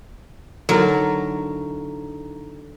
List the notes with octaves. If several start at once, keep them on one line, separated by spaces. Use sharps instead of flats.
D3 F#3 D#4 E4 A#4 D5 A#5